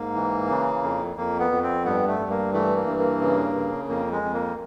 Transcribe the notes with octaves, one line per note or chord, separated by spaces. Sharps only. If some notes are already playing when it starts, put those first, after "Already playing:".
Already playing: G#2 A#3
E3
C#3
F2
F2 A#3
B3
F2
C4
G2 B3
A3
G2
A#3
E3 A3
A#3
G2
A#3
C#3
C#3
F2 A#3
G#3
F2
A#3